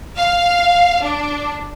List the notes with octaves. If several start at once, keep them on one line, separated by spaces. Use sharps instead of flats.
F5
D4